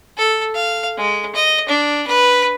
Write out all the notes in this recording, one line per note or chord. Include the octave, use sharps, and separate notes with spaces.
A4
F5
G#3
D#5
D4
B4